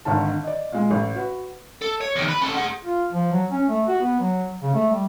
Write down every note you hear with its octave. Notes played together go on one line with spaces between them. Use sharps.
G#1 D3 D#3 A5
D5 D#5
A#2 G#3
A1
F#4 B4
A4
C#5
E2 D#3
B4
C#4 A4
G#4 F#5
F4
F3
F#3
C#4
A3
F#4
B3
F#3
C#3
A3
G3